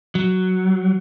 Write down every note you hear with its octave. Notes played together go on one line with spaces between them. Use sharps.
F#3